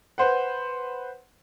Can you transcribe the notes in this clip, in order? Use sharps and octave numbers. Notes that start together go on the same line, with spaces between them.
B4 C5 F#5